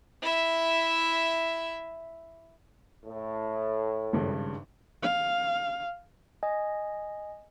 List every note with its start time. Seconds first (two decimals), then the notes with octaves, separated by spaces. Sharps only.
0.22 E4 E5
3.05 A2
4.13 G#1 G2 C#3
5.02 F5
6.43 D#5 G#5